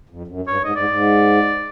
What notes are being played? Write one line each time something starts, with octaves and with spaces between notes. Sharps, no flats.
F2
F#2
G2 C#5
G#2 D#5
G#2 D5
G#2